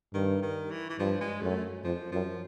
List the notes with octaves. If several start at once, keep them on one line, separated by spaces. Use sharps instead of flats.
G2 D#3
D#3
E3
E3
G2 F3
G#3
F#2 A3
F2 F3
F#2 F3